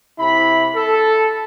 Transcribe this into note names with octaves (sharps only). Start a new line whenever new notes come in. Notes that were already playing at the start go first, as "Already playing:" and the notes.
C3 E4 B5
A4